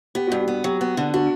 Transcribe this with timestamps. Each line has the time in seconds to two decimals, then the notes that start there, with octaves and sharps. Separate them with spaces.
0.15 B3 G4
0.27 G2 F#4
0.39 G4
0.48 B3
0.64 F#3 G4
0.81 B3
0.97 D3
1.14 D4 F#4